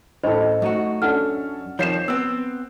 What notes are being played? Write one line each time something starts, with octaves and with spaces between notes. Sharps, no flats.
A1 A4 C5 D#5
F#2 A3 D#4 F#4
C#4 D4 A4 F#5 F6
F2 D#3 F3 C#5 G6 C7 E7
B3 C4 E6